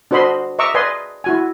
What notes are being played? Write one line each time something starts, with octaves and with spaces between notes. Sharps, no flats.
D4 F#4 C5 D#5 B5 C6
D#5 E5 A#5 C#6 D6 E6
B4 D5 D#5 G#5 C6
E4 F#4 G#5